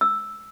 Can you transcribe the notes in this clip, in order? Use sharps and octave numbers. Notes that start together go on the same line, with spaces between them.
E6